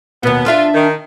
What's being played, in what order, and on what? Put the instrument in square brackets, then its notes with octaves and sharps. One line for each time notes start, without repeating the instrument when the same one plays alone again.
[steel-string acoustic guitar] D#2 B2 [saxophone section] B3
[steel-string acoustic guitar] D4 E5 A5 [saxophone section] F4
[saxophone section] D#3